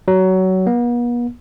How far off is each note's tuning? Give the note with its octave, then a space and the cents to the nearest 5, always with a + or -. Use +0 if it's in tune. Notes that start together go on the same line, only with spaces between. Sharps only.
F#3 +20
B3 -45